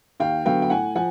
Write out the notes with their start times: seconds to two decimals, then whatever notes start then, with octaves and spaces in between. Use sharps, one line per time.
0.20 D#2 F5 G5
0.45 D3 F#3 B3 F5 G5
0.62 G5
0.70 A2 F#5 G#5
0.95 F3 F#5 G#5